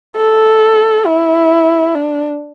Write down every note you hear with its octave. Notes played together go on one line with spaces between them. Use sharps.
A4
E4
D4